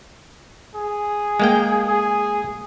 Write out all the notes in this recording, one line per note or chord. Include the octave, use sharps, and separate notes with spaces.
G#4
G#3 A#3 G5
G#4